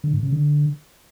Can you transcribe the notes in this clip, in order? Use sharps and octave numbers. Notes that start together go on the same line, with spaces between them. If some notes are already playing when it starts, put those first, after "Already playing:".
D3
G#2
C#3
D3